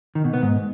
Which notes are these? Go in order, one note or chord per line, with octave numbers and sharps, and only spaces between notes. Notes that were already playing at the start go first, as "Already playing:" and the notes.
D#3
B2
B3
G#2